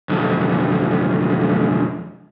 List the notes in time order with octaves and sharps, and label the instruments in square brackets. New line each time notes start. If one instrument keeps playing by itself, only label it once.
[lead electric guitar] B1 F2